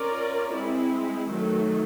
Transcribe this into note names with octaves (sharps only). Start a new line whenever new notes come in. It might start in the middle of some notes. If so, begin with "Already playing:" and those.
Already playing: C#4 F4 A#4 D5
G#3 C4 E4
D#3 F#3 A3